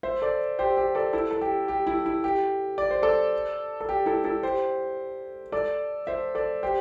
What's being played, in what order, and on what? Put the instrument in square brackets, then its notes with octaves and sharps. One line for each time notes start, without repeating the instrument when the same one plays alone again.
[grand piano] C5 E5
A4 D5
G4 C5
G4
A4 D5
E4 A4
A4
G4
G4
E4
E4
G4
D5
C5
A4 D5
A4
G4
E4 A4
E4 A4
G4 C5
A4 D5
C5 E5
A4 D5
G4 C5